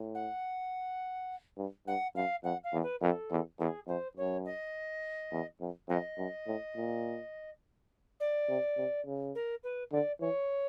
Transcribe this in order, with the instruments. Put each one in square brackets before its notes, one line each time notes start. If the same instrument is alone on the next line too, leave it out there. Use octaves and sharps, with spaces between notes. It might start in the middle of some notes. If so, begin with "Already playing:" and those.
Already playing: [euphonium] A2
[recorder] F#5
[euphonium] G2
[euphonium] G2 [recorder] F#5
[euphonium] F#2 [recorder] F5
[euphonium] F2 [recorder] F#5
[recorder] F5
[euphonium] E2
[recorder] B4
[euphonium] F2 [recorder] A#4
[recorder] A4
[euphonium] E2
[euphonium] E2 [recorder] A4
[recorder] G#4
[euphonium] F2 [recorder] C5
[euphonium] F#2 [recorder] C#5
[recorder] D#5
[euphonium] E2
F2
[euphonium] F2 [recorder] D#5
[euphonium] F#2
A2
A#2
[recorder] D5
[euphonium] C3
C3
C#3
[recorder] A#4
B4
[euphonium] D3 [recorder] D5
[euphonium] E3 [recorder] C#5